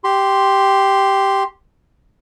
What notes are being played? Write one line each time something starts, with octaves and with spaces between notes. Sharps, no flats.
G4 C6